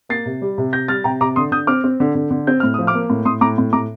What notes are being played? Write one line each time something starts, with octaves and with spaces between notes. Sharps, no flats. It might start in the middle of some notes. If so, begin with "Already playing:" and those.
A#3 A6 C7
C3
G3
C3
C3 G6 A#6
G3 F6 A6
C3 G5 A#5
C3 A#5 D6
D3 C6 D#6
D3 D#6 G6
C4 D6 F6
C4
D3
D3
D3
C4 G6
A2 F6
F3 D#6
D6 F6
A#3
A2
A2 C6 D#6
A2 A#5 D6
A2
A2 A#5 D6